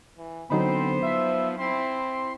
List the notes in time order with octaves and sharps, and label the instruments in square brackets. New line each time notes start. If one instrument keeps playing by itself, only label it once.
[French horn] E3
[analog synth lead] D3 [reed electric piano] F#3 D#4 B5 [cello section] B3 C5 [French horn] C4
[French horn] F3 [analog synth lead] E5
[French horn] C4 [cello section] E4 [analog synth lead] C6